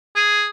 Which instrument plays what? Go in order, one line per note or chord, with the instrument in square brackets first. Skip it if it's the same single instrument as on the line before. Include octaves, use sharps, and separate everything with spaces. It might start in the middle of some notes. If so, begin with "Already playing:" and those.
[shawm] G#4